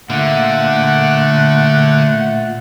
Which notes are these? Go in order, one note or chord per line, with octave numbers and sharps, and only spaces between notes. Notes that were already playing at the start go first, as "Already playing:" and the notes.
A#2 D3 A3 F#5